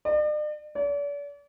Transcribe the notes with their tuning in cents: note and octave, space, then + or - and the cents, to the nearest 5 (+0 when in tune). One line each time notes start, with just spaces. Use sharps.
D5 +45
D5 -40